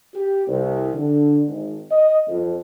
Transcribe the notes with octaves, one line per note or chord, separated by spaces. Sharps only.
G4
C2
D3
G#1
D#5
F2